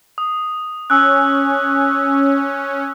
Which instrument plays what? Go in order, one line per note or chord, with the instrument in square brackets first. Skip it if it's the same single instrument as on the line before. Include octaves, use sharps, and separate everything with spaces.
[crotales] D#6
[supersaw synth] C#4 [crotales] E6 F#6